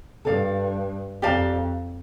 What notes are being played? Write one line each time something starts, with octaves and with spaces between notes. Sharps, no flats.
G2 A4 D5 F5
F2 G4 D5 F5 A5